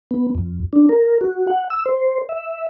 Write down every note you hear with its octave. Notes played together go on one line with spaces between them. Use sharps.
B3
F2
D4
A#4
F#4
F#5
E6
C5
E5